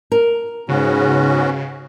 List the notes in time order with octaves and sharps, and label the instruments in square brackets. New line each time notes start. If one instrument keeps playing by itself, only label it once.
[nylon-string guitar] A#4
[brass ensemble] G#2 [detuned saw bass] C#3 [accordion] B3 C#4 F#4